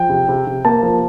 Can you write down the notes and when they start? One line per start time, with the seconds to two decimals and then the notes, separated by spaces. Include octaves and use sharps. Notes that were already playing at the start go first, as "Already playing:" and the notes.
Already playing: F3 G5
0.10 C3
0.29 C3
0.47 C3
0.65 A#3 A5
0.83 F3